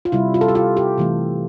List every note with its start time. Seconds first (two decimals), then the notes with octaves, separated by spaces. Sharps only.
0.05 F4
0.12 C3 G3 E4
0.34 F4
0.41 A4
0.48 G4
0.55 F4
0.77 G4
0.98 C3 E3 A3